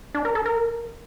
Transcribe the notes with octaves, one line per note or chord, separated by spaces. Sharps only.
D4
A#4
A4
A#4